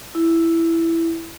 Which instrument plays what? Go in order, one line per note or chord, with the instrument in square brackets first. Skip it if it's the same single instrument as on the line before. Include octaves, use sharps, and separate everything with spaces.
[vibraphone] E4